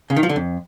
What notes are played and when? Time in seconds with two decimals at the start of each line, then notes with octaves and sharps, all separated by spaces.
0.10 C#3
0.16 D#3
0.23 F3
0.29 D3
0.36 F2